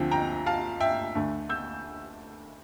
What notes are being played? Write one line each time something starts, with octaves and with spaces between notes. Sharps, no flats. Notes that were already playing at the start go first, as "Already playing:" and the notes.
Already playing: D2 D3 F3 C4
G5 A#5
F5 A5
E5 G5
D2 D3 A3
E6 G6